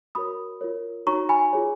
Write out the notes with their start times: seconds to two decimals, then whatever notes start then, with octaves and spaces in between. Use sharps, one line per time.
0.15 F#4 A#4 C#5 B5 D#6
0.61 F4 A#4 C#5
1.07 D#4 F#4 C#5 A#5 C#6
1.29 G#5 B5
1.53 F4 G#4 C#5